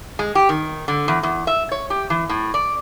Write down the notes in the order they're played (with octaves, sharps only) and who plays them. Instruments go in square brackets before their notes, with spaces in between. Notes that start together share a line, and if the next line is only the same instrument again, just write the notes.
[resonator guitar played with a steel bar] G#3
G4
D#3
D3
E2
E2
E5
C#5
G4
E3
A2
D5